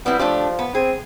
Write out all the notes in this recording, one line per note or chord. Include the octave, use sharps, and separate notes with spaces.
G3 B3 C4 E4
F3 A3 D4 G4
B3
C4 G#4